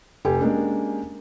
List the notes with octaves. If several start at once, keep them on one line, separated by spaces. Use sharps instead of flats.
F1 G4 G#5
G#3 A#3 C#4 D4 G4